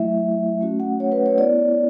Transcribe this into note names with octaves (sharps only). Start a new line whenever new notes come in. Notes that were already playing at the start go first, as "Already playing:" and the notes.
Already playing: F#3 A3 E4 E5
A3 C#4 F#4
F#5
C#5
B4
C#5
B3 E4 D5